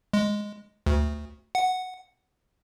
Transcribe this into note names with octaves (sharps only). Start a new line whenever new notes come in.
G#3
D2
F#5